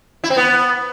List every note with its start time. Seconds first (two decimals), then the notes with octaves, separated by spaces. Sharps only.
0.24 E4
0.30 C4
0.37 B3